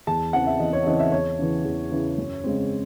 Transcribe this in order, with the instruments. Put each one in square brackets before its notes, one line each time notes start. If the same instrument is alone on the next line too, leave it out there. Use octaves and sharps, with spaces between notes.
[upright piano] E2 A5
C#3 E3 C4 F#5
E5
E2 D#5
C#5
C#3 E3 C4 D#5
E5
E2 C#5
C#3 E3
E2
C#3 E3
F#2
C#3 G#3 C4